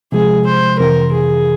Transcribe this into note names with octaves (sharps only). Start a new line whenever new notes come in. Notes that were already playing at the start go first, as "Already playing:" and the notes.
C3 F3 G#3 G#4
C5
F2 C3 E3 A#4
G#4